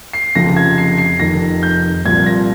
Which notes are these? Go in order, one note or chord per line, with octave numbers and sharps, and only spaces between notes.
C7
F1 F2 C#3 F3 A#6
G#6
C7
C7
F1 F2 D#3 A#6
G6
C2 A#2 F3 G#6
A#6